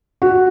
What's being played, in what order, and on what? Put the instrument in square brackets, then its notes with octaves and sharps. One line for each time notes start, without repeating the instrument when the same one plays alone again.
[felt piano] F#4